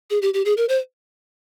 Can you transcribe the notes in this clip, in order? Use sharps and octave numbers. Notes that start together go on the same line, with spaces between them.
G#4
G4
G4
G#4
A#4
C5